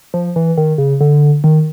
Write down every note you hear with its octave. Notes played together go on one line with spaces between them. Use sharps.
F3
E3
D#3
C#3
D3
D#3